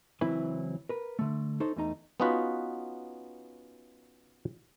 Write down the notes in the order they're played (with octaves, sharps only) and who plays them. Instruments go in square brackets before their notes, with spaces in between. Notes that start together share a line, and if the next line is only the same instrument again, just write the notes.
[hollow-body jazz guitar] C#2 E3 F#3 C4 E4 B4
A#4 B4
D3 A3
D#4 A4 C5 C#5
E2 A3 D#4 A#5
[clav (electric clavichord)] B3 C#4 D#4 F4 F#4 B4